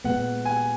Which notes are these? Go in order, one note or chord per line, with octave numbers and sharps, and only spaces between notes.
A#2 G#3 B3 F#5
G#5